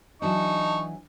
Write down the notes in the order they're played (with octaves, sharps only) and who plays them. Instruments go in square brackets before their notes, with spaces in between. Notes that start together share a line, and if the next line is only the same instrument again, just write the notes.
[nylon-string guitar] E3 F#3 D4 [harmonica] D#4 [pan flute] A5 [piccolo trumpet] C#6